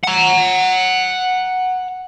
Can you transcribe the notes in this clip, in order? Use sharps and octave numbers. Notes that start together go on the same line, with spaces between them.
F#5 A#5